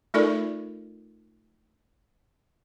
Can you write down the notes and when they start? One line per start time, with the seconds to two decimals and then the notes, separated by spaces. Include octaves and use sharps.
0.14 A3 D#4 F4 A4 A#4 D5